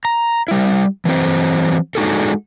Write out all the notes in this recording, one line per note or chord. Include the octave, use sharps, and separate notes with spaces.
A#5
G3 E4
E3 F#3 C4 C5
G#3 D4 D#4 F#4 G#4 A4